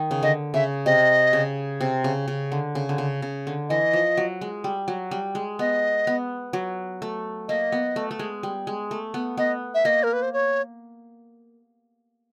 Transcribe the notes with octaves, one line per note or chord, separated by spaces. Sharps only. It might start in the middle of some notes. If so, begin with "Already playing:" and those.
Already playing: D#3
C#3
D3 D#5
C#3 E5
C3 D#5
C#3
C3
C#3
C#3
D3
C#3
D3
C#3
C#3
D3
E3 D#5
F3
F#3
G#3
G3
F#3
G3
G#3
B3 D#5
B3
F#3
A3
A#3 D#5
B3
A3
A3
G#3
G3
G#3
A3
B3
B3 D#5
E5
A#3 D#5
A#4
B4
C5
C#5